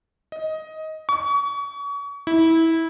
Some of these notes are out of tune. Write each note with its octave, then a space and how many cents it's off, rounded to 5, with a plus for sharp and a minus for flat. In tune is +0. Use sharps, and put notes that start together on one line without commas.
D#5 +15
C#6 +35
E4 -20